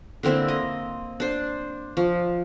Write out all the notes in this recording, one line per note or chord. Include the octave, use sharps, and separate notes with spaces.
D3 A#3 C4 E4
D#5
D4 C5
F3